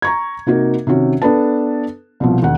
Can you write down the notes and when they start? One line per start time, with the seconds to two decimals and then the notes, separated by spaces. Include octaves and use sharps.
0.02 A#5 C#6 G#6
0.46 C3 A#3 D#4 F#4 A#4
0.87 C3 D#3 C#4 F#4
1.22 B3 D4 A4 B4 A5
2.20 C2 B2 F3
2.42 E1 D#2 F#5